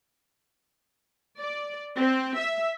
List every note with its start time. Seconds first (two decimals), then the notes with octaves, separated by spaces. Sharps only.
1.39 D5
1.97 C4
2.38 E5